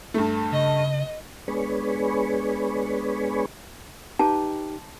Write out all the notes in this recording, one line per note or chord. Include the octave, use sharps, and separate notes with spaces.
G2 A3
C#3 D#5
G#3 B3 D4 G#4 B4 C#5
D#4 G4 B4 A5